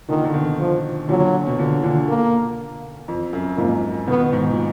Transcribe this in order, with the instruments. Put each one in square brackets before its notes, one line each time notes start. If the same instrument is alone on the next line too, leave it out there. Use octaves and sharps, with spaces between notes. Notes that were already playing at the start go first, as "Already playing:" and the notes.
[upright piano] A#2 D3 [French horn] D#3
[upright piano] D3
B2 D#3
[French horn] F3
[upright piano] A#2 D3 [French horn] F#3
[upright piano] B2
A#2 D3
A#2 D3
[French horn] A#3
[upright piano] F2
F#2
[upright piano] F2 G#2 [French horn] A#3
[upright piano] B2 D#3 [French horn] B3
[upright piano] G#2 B2
A#2